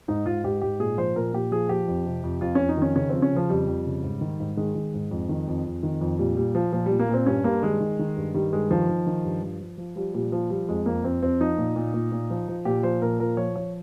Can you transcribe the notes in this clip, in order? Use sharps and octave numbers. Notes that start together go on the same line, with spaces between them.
G#2 D#4
G#2 F4
G#2 G4
G#2 G4
A#2 G#4
F3 C5
A#2 A#4
A#2 G4
F3 G#4
F3 G4
F2
C3
F2
F2 F4
F2 C#4
D#4
D#3 C#4
C#3 C#4
F3 C4
C#4
C#3 F3
F2 G3
F2
C#3
G#2
D#3
G#2
D#3 G#3
D#3
G#2
F2
D#3
F2
F2
D#3
F2
A#2 G3
A#2 G3
F3
A#2 F3
G3
A#2
A#3
A#2 C4
G2 C#4
G2 A#3
D#3 G#3
D#3
D#3
G2
D#3 G3
G2 G#3
D#3 F3
D#3
D#3
G2
F3
F3
F3
F3 G3
A#2 G3
F3
F3 G3
F2 G#3
F2 A#3
F2 C4
F2 C4
F3 D#4
A#2
A#2
A#2
A#2
F3
F3
A#2 G4
F3 C5
A#2 A#4
F3 A#4
F3 C#5
F3 C#5